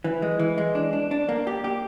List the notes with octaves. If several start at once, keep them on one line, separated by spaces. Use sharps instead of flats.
E3
G#3
E3
G#3
D4
D4
D4
A#3
G4
G4